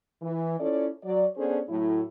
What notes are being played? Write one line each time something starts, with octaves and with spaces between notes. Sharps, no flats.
E3
C#4 E4 F4 A4 C#5 D5
F#3 D5
B3 C#4 D4 G#4 A4 C5
A2 F#3 E4